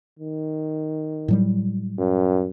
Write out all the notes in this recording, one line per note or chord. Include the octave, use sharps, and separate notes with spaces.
D#3
A2 F#3 G3
F#2